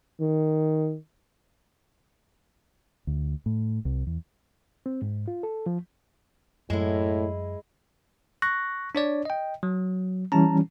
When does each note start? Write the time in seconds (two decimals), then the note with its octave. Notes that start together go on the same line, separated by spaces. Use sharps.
0.21 D#3
3.07 D2
3.46 A2
3.85 C2
4.07 E2
4.86 C4
5.02 G#2
5.28 F4
5.43 A4
5.66 F3
6.70 F#2 A2 G#3 E4
8.42 C#6 F#6 A#6
8.95 D4 C#5 D5
9.25 D#5 G5
9.63 F#3
10.32 E3 G3 C#4 A5 A#5